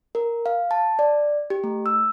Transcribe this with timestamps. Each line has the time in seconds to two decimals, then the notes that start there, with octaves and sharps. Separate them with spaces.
0.15 A#4
0.46 F5
0.71 A5
0.99 D5
1.50 G4
1.64 A3
1.86 E6